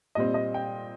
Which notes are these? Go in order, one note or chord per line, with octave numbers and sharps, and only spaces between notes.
A#2 G3 C4 D#5
D#5
G5